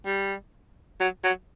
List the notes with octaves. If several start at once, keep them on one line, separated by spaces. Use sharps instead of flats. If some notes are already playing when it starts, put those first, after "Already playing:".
G3
F#3
F#3